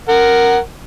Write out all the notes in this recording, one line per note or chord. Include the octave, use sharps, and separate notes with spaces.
A#4 F#5